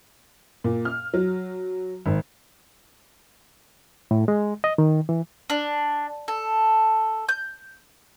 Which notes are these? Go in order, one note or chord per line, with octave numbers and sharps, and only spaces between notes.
A#2
F6
F#3
G#1
A2
G#3
D#5
D#3
E3
D4
A4
G6